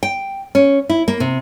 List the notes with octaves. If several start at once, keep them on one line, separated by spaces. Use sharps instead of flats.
G5
C#4
E4
A#3
C3